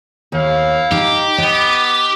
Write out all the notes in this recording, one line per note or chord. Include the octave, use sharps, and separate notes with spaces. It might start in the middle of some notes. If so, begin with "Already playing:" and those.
D#2 E4 F5
D#4 G4
B3 D#4 D#5